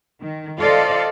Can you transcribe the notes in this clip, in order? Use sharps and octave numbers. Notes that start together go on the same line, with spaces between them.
D#3
F4 A4 C5 D5 D#5 F5